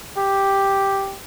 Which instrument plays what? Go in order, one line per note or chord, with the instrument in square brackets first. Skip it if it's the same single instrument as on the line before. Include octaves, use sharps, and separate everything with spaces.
[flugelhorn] G4